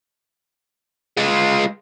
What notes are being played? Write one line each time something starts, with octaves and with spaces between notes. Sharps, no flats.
G#3 F4